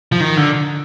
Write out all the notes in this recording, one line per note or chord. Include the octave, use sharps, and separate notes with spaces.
F3
D#3
D3